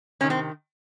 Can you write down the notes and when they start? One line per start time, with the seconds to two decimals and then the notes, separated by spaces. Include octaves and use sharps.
0.21 C3 D#3 C#4
0.30 C4